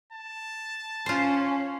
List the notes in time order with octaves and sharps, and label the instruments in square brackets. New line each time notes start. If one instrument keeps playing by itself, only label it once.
[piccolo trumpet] A5
[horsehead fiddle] C#4 [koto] F4 C5